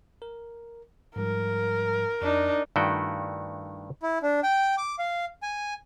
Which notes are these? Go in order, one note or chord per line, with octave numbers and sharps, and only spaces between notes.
A#4
G#2 F3 G3 A#4
F2 D4 D#4
G2 D#3 A3 E4 F#4 G5
E4
D4
G5
D6
F5
G#5